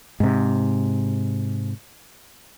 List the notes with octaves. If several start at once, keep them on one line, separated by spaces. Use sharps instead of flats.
G#2 C3